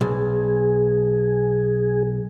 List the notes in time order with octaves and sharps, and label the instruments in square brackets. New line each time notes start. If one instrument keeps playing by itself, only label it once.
[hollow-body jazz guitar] B1 [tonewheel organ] G#4